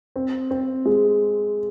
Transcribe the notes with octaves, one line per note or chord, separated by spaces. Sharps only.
C4
C4
G#3